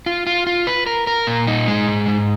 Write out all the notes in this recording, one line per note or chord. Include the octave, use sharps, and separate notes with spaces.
F4
F4
F4
B4
A#4
A#4
A#2
D#4
G#3
G#2
G#2